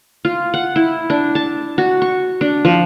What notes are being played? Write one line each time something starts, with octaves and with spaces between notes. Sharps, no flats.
F4
F#5
E4
D4
A5
F#4
C#6
D4
F3